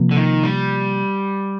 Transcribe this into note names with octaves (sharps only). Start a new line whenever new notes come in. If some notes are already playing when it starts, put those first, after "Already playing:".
Already playing: C3 F3 A#3
D3
D#3
G3